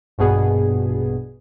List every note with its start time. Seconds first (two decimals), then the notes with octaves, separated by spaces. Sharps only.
0.18 A#1 G2 B2 B3 G#4